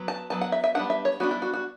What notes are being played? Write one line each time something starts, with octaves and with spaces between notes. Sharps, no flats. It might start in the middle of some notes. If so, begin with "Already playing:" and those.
Already playing: F#3 B3
A5
F#3 B3 A5
F#5
E5
E5
G3 B3 D4 F#5
E5
C#5
G3 B3 D4 F#4
E4
F#4
F#4